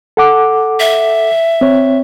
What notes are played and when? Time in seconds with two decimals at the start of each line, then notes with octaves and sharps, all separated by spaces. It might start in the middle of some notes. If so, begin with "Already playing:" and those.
0.17 A4 F#5 D6
0.80 E5
1.61 C4 C#5